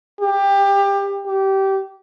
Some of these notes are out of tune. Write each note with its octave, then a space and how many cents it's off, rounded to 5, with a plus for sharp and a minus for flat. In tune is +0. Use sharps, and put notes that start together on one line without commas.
G4 +20
G4 -20